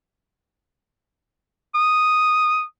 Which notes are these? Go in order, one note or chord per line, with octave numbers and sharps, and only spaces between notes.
D#6